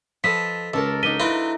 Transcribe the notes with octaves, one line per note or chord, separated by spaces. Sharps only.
F3 A4 B4 D#5 B6
C#2 A4 A#4 A5
F#3 D4 D#4 B6 D#7 G7
E4 F4 B4 E5